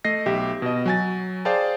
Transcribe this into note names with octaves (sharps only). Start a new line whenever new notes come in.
A3 D#5 A#6 C7
B1 G4 E5
B2 D#5
F#3 G#5 A6
G#4 C5 D5 F5 G5 A5